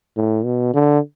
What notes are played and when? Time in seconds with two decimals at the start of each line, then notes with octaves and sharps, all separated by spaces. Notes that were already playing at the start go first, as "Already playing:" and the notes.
0.17 A2
0.45 B2
0.74 D3